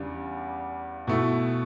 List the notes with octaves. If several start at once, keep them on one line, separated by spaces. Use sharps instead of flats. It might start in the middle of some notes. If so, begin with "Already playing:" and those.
Already playing: E2 C#3 G3 D4
B2 A3 E4